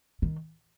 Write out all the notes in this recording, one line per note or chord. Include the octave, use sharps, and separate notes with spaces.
D#3